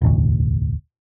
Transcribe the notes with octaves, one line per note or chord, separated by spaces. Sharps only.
E1 A1 D2